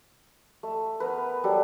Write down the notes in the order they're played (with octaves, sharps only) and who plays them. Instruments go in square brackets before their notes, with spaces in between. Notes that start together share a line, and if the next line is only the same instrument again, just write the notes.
[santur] A3
B3 A#4 B4
F#3 G3 A4